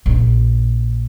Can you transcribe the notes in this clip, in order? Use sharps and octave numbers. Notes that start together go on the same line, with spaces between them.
A#1 D#4